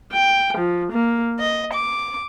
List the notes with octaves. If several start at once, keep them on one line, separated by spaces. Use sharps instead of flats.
G5
F3
A#3
D#5
D6